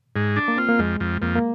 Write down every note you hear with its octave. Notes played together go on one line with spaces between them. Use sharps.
G#2
D4
A#3
C4 F4
A#3
F2 G#3
F2
F2 A#3
A#3